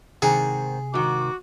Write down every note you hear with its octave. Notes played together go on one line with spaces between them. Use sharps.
G#2 C3 D#3 C4 G#4
G#2 D#3 F#4 D6